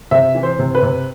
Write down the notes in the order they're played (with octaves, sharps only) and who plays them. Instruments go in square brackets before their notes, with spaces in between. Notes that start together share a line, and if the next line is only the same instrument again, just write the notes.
[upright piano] C3 E5
E3
C5
C3
B4
C3